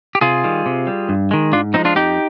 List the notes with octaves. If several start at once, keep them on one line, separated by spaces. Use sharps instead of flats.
G4
C3 F4 G#4
D#3 G3
C3
G3
G2
D#3 G#3
G#2 D4 F4
F3 C4 D#4
G#3
D4 F4
F2 D#4 G4